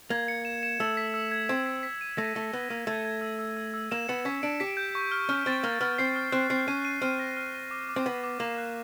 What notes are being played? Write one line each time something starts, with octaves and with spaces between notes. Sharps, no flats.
A#3 G#6
C#7
E7
E7
A3 E6
B6
E6
G#6
C4 G#6
B6
B6
D#7
A3 A#6
A3 D#7
B3 G7
A#3 D#7
A3 G#6
G#6
E6
E6
E6
E6
A#3 E7
B3 C#7
C#4 B6
D4 D7
G4 B6
G6
C#6
F6
C#4 F6
C4 A6
A#3 F6
B3 F6
C4 C7
F6
C4 F#6
C4 C7
C#4 D#7
D#7
C4 F6
A#6
F6
D#7
D6
D6
C4
B3 B6
D6
A#3 E7
F#6